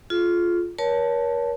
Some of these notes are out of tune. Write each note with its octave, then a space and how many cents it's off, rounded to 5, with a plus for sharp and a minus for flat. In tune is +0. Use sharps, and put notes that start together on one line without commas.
F4 +0 G#4 +45
A#4 +40 C#5 +20 A5 +0